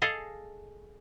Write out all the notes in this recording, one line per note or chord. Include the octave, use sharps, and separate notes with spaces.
G#4 A4 D#5 F5